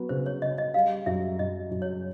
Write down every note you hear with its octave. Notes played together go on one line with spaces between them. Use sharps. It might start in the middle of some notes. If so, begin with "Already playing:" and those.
Already playing: F#3 B3
C#3 C5
C#5
C#3 D#5
D#5
G3 F5
F#2 E5
F#2 D#5
F#2
C#5